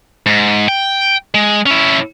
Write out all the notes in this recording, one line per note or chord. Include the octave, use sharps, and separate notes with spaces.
G#2
G5
G#3
C#4 E4